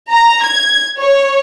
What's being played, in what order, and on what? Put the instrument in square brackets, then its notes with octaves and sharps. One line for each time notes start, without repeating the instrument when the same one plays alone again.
[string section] A#5
G#6
C#5